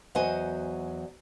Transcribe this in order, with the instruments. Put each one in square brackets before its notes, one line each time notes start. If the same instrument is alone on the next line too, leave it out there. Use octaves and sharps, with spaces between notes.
[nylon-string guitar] E2 F#3 F#4 C5 D#5 G#5